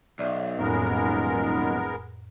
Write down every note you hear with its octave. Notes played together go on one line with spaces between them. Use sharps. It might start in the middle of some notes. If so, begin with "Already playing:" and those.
B1 D5 E5
D#1 F2 A2 G#3 B3 A#4